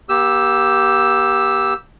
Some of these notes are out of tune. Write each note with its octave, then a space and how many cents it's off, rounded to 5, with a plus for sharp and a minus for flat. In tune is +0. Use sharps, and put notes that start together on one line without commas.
A#3 +40 G4 +0 E6 +0